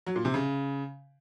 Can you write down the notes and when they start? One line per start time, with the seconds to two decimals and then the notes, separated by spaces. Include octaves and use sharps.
0.07 F#3
0.16 A#2
0.25 C3
0.34 C#3